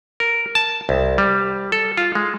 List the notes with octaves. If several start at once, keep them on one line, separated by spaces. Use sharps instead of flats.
A#4
A5
C2
G3
A4
F4
G#3